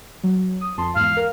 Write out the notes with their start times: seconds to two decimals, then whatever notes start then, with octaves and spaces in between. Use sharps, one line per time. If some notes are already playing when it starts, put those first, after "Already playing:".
0.23 F#3
0.61 D#6
0.77 F2 A5 C6
0.96 E2 G#2 F5
1.17 A#4